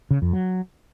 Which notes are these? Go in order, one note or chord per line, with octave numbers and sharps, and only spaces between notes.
C#3
F2
F#3